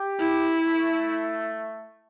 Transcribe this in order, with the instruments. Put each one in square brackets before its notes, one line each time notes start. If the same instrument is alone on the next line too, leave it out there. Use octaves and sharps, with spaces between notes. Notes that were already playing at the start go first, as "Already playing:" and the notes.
Already playing: [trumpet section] G4
[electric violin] E4
[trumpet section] A3